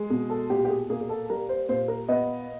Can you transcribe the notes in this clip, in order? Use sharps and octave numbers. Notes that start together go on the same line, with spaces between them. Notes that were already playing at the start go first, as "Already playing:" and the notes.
Already playing: G#3
B2 G#4
A4
A#2 G4
G4
G#4
A#3 G#4
G#4
A4
G3 A#4
C5
A#2 C5
A#4
B3 D#5